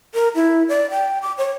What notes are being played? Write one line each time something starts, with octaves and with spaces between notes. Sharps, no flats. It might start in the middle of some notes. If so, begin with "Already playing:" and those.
A#4
E4
D5
G5
D6
C#5